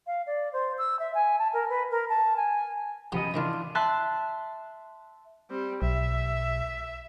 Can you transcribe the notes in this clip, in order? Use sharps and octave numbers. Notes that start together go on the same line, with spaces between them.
F5
D5
C5
E6
E5
G#5
A5
A#4
B4
A#4
A5
G#5
F#2 F3 B3 G4 D#5 C6
G#2 D#3 E3 D4 E4 F4
E5 A5 C6 F#6
G3 C4
B1 E5